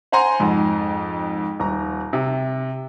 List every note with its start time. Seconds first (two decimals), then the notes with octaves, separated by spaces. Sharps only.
0.12 C5 F#5 G#5 A#5 C6
0.40 F2 G#2
1.60 D#1 A#5
2.13 C3